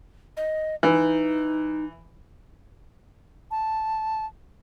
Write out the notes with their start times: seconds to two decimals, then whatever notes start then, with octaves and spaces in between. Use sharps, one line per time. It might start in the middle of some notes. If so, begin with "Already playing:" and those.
0.37 D#5
0.83 E3 D#4
3.51 A5